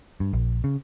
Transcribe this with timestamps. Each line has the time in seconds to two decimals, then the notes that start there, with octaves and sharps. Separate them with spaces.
0.20 G2
0.33 A#1
0.64 C#3